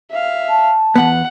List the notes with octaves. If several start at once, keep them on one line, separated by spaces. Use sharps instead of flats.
E5 F5
A5
E2 G#2 B3 F#5